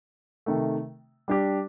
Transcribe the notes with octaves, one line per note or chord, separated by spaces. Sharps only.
C3 D#3 A3
G3 D4 G4